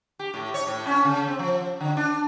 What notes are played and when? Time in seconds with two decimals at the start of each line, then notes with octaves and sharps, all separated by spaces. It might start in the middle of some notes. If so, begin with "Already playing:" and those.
0.19 G4
0.34 A2
0.54 C#5
0.67 A2
0.87 C#4
1.04 C#3
1.28 C4
1.39 F3
1.80 D3
1.97 D4